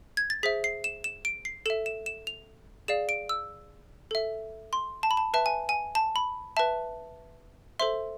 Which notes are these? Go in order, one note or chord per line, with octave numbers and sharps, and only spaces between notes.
G#6
A6
G#4 C5 E5 B6
C7
E7
E7
D7
C7
A4 E5 E7
E7
E7
F7
G#4 D5 F5 E7
D7
E6
A4 E5
C6
A5
B5
A5
B4 E5 A5
G#5
G#5
A5
B5
B4 E5 A5
A4 C5 E5 C6